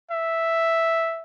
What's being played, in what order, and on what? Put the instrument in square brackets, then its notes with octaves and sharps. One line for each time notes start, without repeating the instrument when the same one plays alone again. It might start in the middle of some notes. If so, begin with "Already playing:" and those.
[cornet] E5